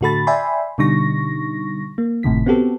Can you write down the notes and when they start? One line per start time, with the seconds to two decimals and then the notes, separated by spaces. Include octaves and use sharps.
0.01 A2 D3 F#4 A4 B5 A6
0.27 D5 E5 G5 G#5 B5 C6
0.78 B2 D3 G3 D#4 C#6 A#6
1.98 A#3
2.23 G1 A2 C3 D#3 B6
2.46 B3 C4 F#4 G4 A4